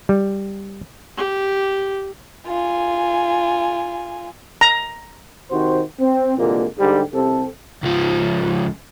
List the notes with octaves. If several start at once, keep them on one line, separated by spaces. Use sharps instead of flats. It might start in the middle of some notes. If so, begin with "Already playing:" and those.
G3
G4
F4 G#5
A#5
C3 D#3 F#4 C5
C4
C2 A#2 D3 E3 G#3 A#3
G#2 D3 G3 G4
C2 C3 C4 A4
C#2 F3